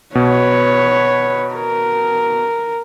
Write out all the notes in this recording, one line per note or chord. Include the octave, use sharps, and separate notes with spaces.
B2 B4 C#5
A#4